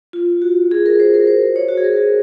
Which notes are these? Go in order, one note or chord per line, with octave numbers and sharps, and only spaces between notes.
F4
F#4
G#4
A#4
C5
A#4
C5
C#5
F#4
G#4
A#4